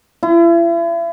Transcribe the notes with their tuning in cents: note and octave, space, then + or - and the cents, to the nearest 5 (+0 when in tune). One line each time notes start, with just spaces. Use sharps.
E4 +40